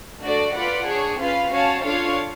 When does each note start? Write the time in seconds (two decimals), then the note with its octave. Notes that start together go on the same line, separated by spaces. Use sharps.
0.22 A3 D4 F#4 A4 D5
0.53 F4 B4 D5 F#5
0.86 D4 G#4 C#5
1.19 C#4 F4 B4 F5
1.51 C#4 F#4 C#5 F5 A5
1.84 D4 F4 A4 C#5 F5